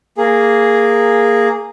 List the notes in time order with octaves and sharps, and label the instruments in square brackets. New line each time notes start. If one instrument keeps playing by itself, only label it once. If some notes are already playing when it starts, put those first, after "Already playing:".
[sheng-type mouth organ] A#3 G#4